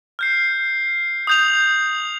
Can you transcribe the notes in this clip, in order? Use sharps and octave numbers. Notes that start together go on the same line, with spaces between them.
F6 G6 C7
D#6 G6 F7